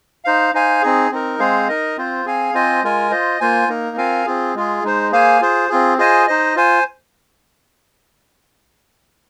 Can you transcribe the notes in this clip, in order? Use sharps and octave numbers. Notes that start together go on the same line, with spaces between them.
D#4 C5 F5
D#4 C5 F5 G#5
C4 D#4 G#4
C4 D#4 A#4
G#3 C4 G#4 C5 F5
D#4 A#4 D#5
C4 F4 C5
C4 G#4 F5 G#5
C4 F4 C5 D#5 G#5
G#3 F4 A#4 G#5
F4 C5 D#5
A#3 F4 C5 G#5
A#3 D#4 A#4
C4 F4 A#4 F5 G#5
C4 F4 G#4
G#3 F4 G#4
G#3 D#4 C5
A#3 G#4 C5 F5 G#5
F4 G#4 C5
C4 F4 G#4
F4 G#4 C5 D#5 G#5
D#4 C5 D#5
F4 C5 G#5